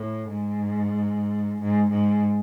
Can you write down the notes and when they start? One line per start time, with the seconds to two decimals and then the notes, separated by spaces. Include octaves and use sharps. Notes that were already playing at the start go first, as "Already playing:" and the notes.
Already playing: A2
0.29 G#2
1.62 G#2
1.92 G#2